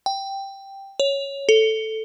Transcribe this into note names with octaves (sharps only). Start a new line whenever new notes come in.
G5
C#5
A4